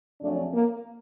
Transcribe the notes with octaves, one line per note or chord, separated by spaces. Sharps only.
F2 C#3 F#3 A3 D4
A#3